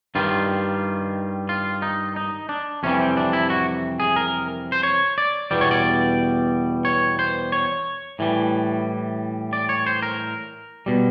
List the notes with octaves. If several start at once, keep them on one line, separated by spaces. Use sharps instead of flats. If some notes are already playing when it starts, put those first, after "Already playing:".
G2 D#3 G3 F4
F4
D#4
D#4
D4
F2 C3 E3 G3 C#4
C4
D4
E4
F#4
G#4
A#4
C5
C#5
D5
E2 B2 G3 D5
C#5
D5
C#5
C5
C#5
A2 E3 G3
D5
C#5
C5
A#4
B2 G3